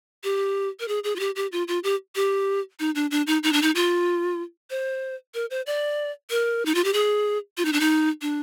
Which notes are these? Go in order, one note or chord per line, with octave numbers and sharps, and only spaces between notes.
G4
A#4
G#4
G#4
F4
G4
G4
F4
F4
G4
G4
D#4
D4
D4
D#4
D#4
D4
D#4
F4
C5
A#4
C5
D5
A#4
D#4
F4
G4
G#4
F4
D#4
D4
D#4
D4